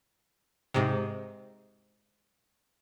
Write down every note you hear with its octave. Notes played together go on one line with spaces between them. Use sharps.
G#2 C3